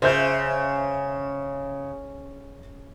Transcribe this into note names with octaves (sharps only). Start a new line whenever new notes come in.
C#3 C5 E5 G6